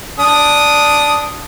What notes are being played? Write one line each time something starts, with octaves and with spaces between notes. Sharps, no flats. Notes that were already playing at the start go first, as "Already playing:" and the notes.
D4 D#6